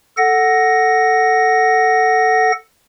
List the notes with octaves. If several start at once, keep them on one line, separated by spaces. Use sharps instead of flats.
A4 F#5 A#6